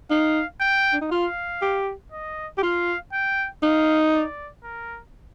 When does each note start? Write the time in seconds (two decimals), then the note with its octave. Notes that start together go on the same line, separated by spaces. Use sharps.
0.11 D#4 F5
0.61 G5
0.93 D4
1.01 D#4
1.11 F4 F5
1.62 G4
2.12 D#5
2.58 G4
2.63 F4 F5
3.13 G5
3.63 D#4 F5
4.14 D5
4.64 A#4